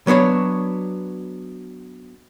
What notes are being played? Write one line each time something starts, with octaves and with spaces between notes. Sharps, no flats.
F#3 B3 D4 C#5